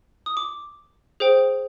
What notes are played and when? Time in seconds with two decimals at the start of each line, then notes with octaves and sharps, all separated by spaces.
0.26 D#6
0.37 D6
1.20 G#4 C5 G5